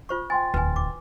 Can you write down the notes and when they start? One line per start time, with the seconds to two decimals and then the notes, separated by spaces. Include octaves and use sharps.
0.09 F4 C5 C#6
0.30 G5 G#5 C6 A6
0.54 D1 E2 B4 G#5
0.76 D6